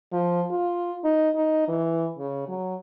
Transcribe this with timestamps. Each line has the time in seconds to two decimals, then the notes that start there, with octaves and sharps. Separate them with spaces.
0.12 F3
0.51 F4
1.04 D#4
1.35 D#4
1.68 E3
2.18 C#3
2.48 F#3